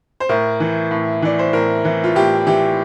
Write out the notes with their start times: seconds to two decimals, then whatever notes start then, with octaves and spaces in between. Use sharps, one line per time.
0.20 C5
0.29 A2 A#4
0.60 E3
0.91 A2
1.22 E3 D5
1.39 C5
1.53 A2 A#4
1.85 E3
2.04 F4
2.15 A2 G4
2.47 E3 G4